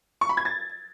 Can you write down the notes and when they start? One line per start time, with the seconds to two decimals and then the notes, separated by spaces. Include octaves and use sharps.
0.21 C#6
0.29 B5
0.37 G#6
0.45 A6